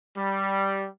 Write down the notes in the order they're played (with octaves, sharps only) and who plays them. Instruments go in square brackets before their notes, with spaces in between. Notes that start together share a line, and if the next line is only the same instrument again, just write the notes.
[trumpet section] G3